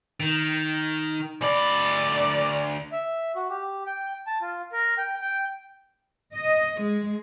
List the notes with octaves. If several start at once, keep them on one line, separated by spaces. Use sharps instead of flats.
D#3
D2 D5 B5
E5
F#4
G4
G5
A5
F4
A#4
G5
G5
D#5
G#3